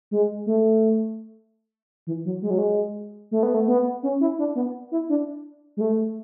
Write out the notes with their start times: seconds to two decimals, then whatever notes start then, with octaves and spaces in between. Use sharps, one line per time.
0.11 G#3
0.46 A3
2.07 E3
2.25 F#3
2.42 G#3
2.50 F#3
2.58 G#3
3.31 A3
3.43 B3
3.54 A3
3.68 B3
4.03 C#4
4.21 E4
4.39 D4
4.56 B3
4.92 E4
5.10 D4
5.77 G#3
5.81 A3